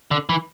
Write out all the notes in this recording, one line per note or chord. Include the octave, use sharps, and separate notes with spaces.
D3
E3